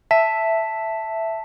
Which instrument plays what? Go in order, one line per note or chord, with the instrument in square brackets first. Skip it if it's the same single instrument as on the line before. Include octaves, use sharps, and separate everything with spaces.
[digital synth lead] E5 [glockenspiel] A5 B6